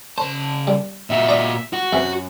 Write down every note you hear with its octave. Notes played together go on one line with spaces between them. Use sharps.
C#3 C5 A5
G3
A#2 F#4 E5
D5 A#5 D#6
F#4
F#2 C3 E3